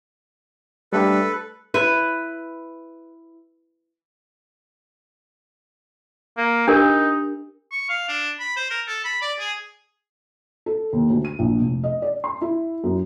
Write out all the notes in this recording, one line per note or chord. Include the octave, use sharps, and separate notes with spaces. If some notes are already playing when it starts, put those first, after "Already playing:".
G3 A3 D4 A4 B4
E4 B4
A#3
D4 D#4 G4 A#4
C#6
F5
D4
B5
C5
A#4
A4
B5
D5
G#4
A4
D#2
D2
D#7
A#1
F1
D#5
D5
C6
E4
F#2